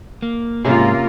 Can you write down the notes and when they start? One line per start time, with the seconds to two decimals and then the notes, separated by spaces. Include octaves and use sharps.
0.22 A#3
0.65 G#2 C3 G#3 A#3 C#4 F4 G#4